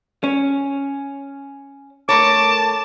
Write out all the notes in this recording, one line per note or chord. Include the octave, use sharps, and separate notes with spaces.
C#4
A3 A#4 C#5 A5 D6